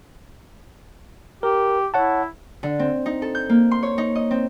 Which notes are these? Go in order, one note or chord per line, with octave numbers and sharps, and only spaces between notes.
G4 A#4
E4 C#5 F#5 A5
D3
C4
D#4
A4
G6
A#3
C6
C#5
D#4
D#5
C4